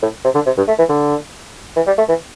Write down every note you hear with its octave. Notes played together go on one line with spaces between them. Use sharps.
A2
C3
D3
C3
G2
A3
E3
D3
E3
G3
A3
E3